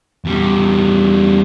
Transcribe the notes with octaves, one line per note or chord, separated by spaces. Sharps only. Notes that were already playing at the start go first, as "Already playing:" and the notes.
E2 G3